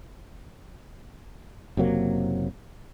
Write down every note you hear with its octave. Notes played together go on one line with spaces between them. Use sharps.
F#1 C3 F#3 A#3